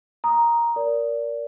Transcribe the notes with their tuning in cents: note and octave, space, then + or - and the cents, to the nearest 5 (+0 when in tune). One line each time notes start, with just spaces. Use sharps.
A#5 +5 D#6 +0
A#4 +0 D5 -20